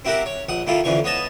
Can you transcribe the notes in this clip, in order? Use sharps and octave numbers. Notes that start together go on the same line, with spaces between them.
C4 E4 F#4 G4 A#4 F#5
C#5
A#1 F#5 D#6
D#3 A#3 E4 F4 A4
F2 D3 E3 C#4 C#6
B3 C#5 D#5 A5